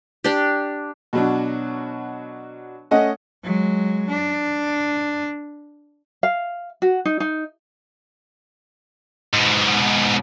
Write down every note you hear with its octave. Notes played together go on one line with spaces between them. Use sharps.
D4 G4
B2 F#3 D4
A3 C#4 D#5 F#5
F#3 G#3
D4
F5
F#4
D#4
D#4
G#2 B2